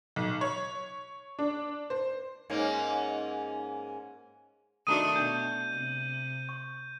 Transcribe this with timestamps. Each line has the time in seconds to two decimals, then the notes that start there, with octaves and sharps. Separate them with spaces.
0.16 B1
0.41 C#5
1.39 D4
1.90 C5
2.50 G#2 A#3 C#4
4.87 D#3 A3 D4 F#4 A#5 D#6 D#7
5.16 B2 D4 G6
5.72 C3
6.49 C#6